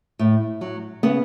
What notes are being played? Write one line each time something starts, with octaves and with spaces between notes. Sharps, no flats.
A2
F#3
C#3 B3